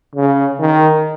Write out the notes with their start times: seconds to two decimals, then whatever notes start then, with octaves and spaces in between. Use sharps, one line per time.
0.16 C#3
0.60 D#3